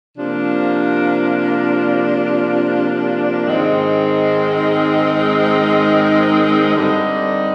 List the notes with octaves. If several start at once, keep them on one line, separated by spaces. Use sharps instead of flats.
C3 F3 A#3 D4
G#2 D#3 G#3 C4 D#4
G2 D3 G3 C4 D#4